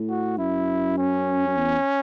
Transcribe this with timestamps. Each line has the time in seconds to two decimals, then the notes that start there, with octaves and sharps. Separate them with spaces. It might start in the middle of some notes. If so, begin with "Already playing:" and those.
Already playing: A2
0.09 F#4
0.38 F#2 E4
0.98 C#4
1.46 F#2
1.56 E2